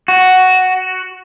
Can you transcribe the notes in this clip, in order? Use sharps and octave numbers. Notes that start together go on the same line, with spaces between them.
F#4